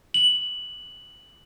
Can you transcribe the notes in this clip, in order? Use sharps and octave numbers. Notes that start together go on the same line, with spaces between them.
F#7